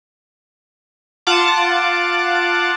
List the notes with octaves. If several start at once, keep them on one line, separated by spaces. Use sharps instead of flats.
F4 F#5 A5 D6